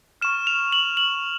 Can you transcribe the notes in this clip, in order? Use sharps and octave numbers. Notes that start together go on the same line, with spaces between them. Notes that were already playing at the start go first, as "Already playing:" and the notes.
C#6 F6 E7
F7
F#7
F#7